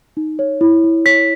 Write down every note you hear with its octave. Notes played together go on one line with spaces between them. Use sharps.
D#4
C#5
E4
E4
C#5 B6